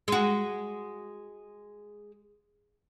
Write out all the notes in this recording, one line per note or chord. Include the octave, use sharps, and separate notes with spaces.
G#3 F#4